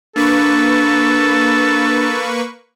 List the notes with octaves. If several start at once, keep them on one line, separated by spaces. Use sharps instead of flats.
A#3 D4 A4 B4 C#6